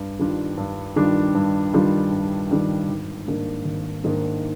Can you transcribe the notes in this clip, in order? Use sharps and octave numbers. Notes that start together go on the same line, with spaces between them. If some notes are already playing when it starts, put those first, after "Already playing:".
Already playing: G2
D#3 G3 D4 F4
G2
D#3 G3 D4 F4
G2
D#3 G3 D4 F4
G2
D#3 G3 D4 F4
G#1
G#2 D#3 A#3 D4
G#1
G#2 D#3 A#3 D4